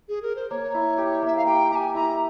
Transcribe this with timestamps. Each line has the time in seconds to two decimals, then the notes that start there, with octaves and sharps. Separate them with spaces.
0.09 G#4
0.22 A#4
0.36 C5
0.50 A#3 C#5
0.74 E4
0.98 G4
1.23 A#3 E5
1.37 F5
1.46 G4 G5
1.71 G4 G#5 A#5
1.95 E4 A#5